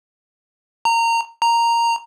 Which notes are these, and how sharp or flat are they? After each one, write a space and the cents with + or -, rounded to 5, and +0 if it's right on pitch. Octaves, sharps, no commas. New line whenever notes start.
A#5 -20
A#5 -5